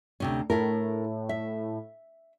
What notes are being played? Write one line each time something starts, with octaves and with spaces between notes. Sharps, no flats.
D2 C3 C#4
A2 E4 A4 A#4
E5